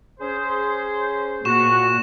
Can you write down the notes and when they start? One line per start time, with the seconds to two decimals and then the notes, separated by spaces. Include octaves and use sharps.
0.20 C#4 G#4 C5
1.45 A#2 F#4 C#6 E7